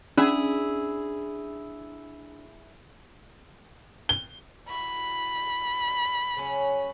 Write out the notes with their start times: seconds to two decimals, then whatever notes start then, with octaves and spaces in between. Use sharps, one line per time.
0.18 C#4 D4 E4 G#4 E5
4.09 G7
4.69 E4 F#4 B5
6.37 C#3 F#3 C#4